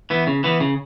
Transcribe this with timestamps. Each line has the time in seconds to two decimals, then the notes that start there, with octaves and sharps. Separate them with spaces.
0.10 E3 B3
0.27 C#3
0.44 E3 B3
0.60 C#3